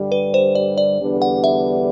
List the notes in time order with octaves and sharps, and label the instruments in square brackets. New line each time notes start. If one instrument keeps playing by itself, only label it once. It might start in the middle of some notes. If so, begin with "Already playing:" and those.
Already playing: [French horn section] G2 D3 G3
[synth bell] B4
C5
D5
D5
[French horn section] E2 D3 G3 B3 D4
[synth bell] F#5
E5